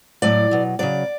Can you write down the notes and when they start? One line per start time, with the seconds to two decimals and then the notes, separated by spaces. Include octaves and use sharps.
0.22 A2 F#3 D5
0.51 B2 F#3
0.79 C#3 F#3 D5